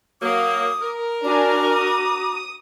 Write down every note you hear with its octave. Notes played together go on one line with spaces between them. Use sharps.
F#3 A#3 D6 D#6
A#4
D4 F#4 G#5 A#5 D6
D#6